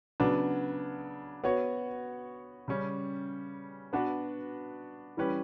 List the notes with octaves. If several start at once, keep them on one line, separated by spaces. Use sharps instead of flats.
C#3 F#3 B3 D4
B3 F#4 C#5
C#3 G3 C#4
B3 D4 F#4 B4
E3 G3 C#4 G4 B4